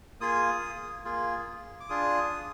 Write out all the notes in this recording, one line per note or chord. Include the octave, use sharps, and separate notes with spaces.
A#3 F4 G#4 D#6
A#3 F4 G#4
D6
D4 F4 G#4 D#6